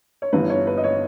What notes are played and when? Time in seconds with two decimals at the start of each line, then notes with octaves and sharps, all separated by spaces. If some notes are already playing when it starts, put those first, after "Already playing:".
0.22 C#5
0.33 G1 G2 E3 B4
0.50 C#5
0.67 B4
0.77 D#5
0.84 C#5